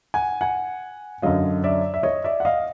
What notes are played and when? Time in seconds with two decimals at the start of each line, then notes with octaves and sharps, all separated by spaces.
0.14 F#5 G#5
0.41 F#5 G#5
1.22 F#2 D3 F#3 D#5 F5
1.64 D5 E5
1.94 E5
2.03 C#5 D#5
2.24 D5 E5
2.40 F#5
2.45 D#5 F5